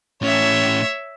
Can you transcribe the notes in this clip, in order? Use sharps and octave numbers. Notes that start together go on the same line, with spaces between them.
A2 C#4 C#5 E5